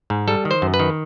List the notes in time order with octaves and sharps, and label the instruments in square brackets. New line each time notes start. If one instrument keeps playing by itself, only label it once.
[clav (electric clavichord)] G#2
G3 A4
D#3
C5
F#2
B4
D#3